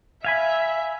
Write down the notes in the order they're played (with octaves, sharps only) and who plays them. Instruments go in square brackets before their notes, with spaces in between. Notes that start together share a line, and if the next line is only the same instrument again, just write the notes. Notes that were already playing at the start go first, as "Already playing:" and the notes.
[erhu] E5 [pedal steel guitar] F5 G#5 B5